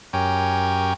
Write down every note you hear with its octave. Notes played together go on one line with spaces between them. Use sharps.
F#2 G4 A#4 C#5 G5 G#5